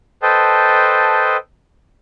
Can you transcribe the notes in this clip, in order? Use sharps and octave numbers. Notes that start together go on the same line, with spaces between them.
A4 B4 C5 D#5 G5 A5